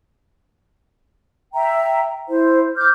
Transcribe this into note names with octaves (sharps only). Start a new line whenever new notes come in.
E5 G5 A#5
E4 C5
D6 F6 G6